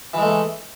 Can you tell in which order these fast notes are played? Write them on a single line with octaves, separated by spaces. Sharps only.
E3 G#3 A3